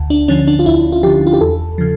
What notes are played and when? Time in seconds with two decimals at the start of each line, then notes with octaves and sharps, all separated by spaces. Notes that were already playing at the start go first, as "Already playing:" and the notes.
Already playing: D2
0.10 D4
0.28 D3 F3 C#4
0.47 D4
0.59 F4
0.66 D2 E4
0.92 F4
1.03 D3 F3 G4
1.27 F4
1.33 G4
1.41 E2 A4
1.78 C#3 F3